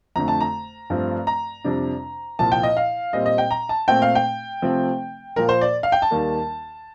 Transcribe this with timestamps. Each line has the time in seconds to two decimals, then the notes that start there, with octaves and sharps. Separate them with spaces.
0.16 F2 D3 A3 A#5
0.28 A5
0.41 A#5
0.90 G2 F3 A3 C4
1.27 A#5
1.64 F2 C3 G3 D4
2.39 C2 A#2 F3 A5
2.52 G5
2.63 D#5
2.77 F5
3.13 A#2 G3 C4 D#5
3.26 D#5
3.38 G5
3.51 A#5
3.69 A5
3.88 A#2 A3 C4 G5
4.02 F5
4.15 G5
4.62 C3 F3 A3 C4
5.36 A#2 F3 A#3 A#4
5.49 C5
5.61 D5
5.83 F5
5.92 G5
6.02 A5
6.11 D#2 D#3 G3 A#3